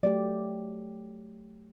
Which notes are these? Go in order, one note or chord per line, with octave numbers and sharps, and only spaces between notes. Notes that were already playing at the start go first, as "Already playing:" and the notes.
F#3 A3 G4 D5